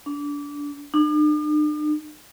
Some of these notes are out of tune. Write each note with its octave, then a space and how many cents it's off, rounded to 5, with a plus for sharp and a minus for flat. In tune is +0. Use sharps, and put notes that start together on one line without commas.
D4 -25
D4 +45